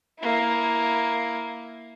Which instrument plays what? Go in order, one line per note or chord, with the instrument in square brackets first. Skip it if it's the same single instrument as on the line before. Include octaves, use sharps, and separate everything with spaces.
[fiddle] A#3 E4